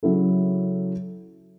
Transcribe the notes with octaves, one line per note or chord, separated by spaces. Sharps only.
C#3 F#3 C#4 E4 A4